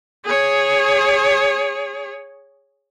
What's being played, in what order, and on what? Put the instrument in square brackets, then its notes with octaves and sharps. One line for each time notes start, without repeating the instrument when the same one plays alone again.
[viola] G#4 C#5